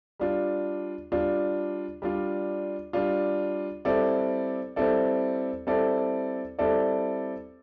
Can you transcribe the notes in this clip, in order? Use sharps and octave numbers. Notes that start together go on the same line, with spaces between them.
G3 D4 F4
G3 D4 F4
G3 D4 F4
G3 D4 F4
G3 C4 E4 A4 D5
G3 C4 E4 A4 D5
G3 C4 E4 A4 D5
G3 C4 E4 A4 D5